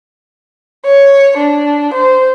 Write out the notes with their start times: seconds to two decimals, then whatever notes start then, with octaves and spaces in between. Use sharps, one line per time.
0.86 C#5
1.37 D4
1.95 C5